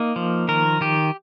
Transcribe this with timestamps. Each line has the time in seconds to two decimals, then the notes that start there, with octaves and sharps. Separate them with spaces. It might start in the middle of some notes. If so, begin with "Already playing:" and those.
Already playing: A#3 D#4
0.16 F3
0.48 D#3 A#4
0.81 D#3 G4